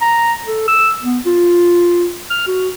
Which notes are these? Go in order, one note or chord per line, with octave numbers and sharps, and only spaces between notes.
A#5
A4
E6
B3
F4
F6
F#4